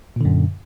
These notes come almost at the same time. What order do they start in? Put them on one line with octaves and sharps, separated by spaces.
A#2 D3 F#2